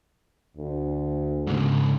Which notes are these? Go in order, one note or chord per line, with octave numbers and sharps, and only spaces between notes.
D2
G#2 C#3